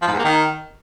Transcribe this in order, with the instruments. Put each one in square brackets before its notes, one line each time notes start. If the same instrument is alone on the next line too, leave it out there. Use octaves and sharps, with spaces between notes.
[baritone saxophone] F3
G#2
E2
A#3
D#3